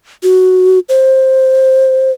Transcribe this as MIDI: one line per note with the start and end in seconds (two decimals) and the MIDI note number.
0.23 0.79 66
0.89 2.11 72